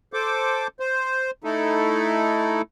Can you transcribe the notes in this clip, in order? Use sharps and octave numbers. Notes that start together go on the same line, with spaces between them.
A4 C5 D6
C5
A3 D#4 E4 A4